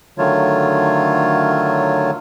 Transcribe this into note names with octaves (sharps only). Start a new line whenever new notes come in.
D3 D#3 F#3 A3 F4 C#5